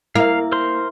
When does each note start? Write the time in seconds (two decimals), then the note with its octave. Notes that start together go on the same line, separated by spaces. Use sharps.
0.15 A#3 E4 E5 F5
0.52 A#4 C5 C6